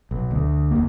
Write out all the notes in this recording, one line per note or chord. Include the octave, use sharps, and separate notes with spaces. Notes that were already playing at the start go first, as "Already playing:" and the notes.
B1
D2
D#2 A#3